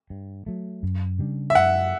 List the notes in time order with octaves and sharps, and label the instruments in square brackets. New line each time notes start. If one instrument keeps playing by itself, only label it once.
[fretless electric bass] G2
F#3 A3
F#2
C#3 G3 D4
[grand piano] E5
[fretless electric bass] F#2 [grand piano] F#5